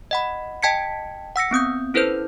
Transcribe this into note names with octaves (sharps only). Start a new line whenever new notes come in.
D#5 F#5 B5
D#5 G5 A5 G#6 B6 C#7
F#5 E6 A#6 C#7
B3 C4 D#6 G6
C#4 E4 A4 B4 C5 G6